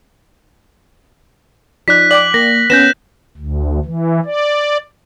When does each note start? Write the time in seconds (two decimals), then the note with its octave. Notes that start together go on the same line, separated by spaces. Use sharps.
1.88 F3 D#4 D5 F#6 B6
2.11 D5 G5 D6 F#7
2.34 A#3 A#6
2.70 B3 C#4 G6 A#6 B6 E7
3.38 D2
3.85 E3
4.25 D5